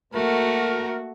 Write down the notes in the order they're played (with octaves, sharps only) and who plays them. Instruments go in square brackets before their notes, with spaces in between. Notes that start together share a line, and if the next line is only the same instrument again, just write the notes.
[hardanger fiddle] A3 [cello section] A#3 F#4 [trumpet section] A#4